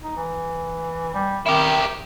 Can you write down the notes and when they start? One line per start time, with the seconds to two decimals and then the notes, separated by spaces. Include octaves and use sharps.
0.04 D#4
0.17 E3
1.14 G3
1.46 D#3 E4 G4